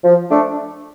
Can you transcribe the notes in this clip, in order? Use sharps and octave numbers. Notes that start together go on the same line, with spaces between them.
F3
A3 D4